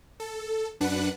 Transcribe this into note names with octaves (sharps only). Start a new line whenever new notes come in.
A4
F#2 D4 B4 F#5 F#6